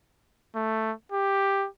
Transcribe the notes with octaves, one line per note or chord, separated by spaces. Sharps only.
A3
G4